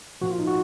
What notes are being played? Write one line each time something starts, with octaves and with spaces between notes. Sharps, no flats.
A#2 F3 F#4
F4
D#4
F#4